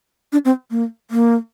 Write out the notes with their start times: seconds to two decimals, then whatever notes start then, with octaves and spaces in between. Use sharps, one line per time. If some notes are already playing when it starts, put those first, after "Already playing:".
0.33 D4
0.45 C4
0.71 A#3
1.11 A#3